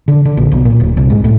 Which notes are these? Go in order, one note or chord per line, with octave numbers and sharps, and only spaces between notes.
D3
D3
A#1
B1
A#2
D1
C2
G#2
A2